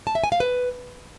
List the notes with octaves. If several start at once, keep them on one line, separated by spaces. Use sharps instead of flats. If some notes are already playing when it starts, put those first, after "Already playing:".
A5
E5
G#5
F5
B4